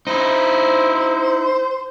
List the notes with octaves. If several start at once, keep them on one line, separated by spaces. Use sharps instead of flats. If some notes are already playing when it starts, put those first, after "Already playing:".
D#4 E4 C5